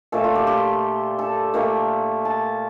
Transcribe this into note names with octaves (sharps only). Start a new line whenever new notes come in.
A#2 A3 A4
F4
G4
G4
A4
A#2 A3 A#4
A5